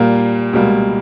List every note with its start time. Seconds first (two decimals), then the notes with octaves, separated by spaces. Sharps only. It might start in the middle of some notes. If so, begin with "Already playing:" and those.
Already playing: A#2 G3 A#3
0.53 C#2 B2 G3 A#3